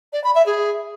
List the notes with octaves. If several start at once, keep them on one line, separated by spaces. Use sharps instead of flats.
D5
B5
E5
G#4